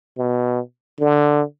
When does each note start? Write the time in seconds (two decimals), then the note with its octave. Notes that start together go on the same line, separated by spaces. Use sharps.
0.17 B2
0.99 D3